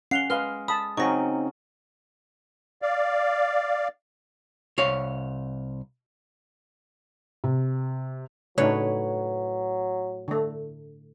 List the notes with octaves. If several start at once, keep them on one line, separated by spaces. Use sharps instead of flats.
C#4 F5 F#5 C7 F7 G7
G#3 B4 F5 F6 G7
A5 B5 D#6
C#3 F#3 C4 C#4 D#4 C#6 A#6
D5 F5
C2 C#5 F5
C3
A2 C#3 F#3 D4 D#4 B4 C#5
D3 A3